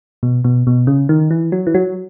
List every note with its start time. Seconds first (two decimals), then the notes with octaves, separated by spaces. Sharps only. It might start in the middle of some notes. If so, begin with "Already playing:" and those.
0.23 B2
0.44 B2
0.67 B2
0.87 C#3
1.09 D#3
1.31 E3
1.52 F#3
1.67 E3
1.75 F#3